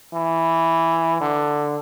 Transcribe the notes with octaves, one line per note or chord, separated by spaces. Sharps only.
E3
D3